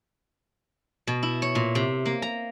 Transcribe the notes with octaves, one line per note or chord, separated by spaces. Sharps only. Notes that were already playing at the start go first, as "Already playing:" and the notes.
B2
E4
C#5
A#2
C3
A#3
A#5